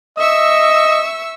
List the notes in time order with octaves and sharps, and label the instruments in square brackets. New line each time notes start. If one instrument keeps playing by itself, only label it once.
[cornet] D#5 [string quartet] E5 C#6 E6